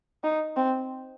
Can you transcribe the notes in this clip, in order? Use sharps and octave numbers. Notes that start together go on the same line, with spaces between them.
D#4
C4